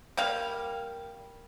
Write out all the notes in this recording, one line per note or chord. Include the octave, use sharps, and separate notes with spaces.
G3 A#3 F5